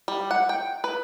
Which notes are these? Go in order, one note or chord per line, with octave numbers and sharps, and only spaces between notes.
G3
F#5
G5
B4